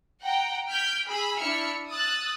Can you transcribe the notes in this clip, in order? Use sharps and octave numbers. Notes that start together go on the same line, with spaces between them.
F#5 G5 A#5
F6 G6 G#6 B6 D7
G#4 B5 E6
D4 E4 E5 F6 C#7
D#6 E6 F#6 A6